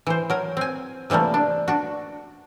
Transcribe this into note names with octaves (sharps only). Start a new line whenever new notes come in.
E3 C5
F#3 A#4
C4 G#5
C3 E3 G3 A3 A#3
D4
D4 F#4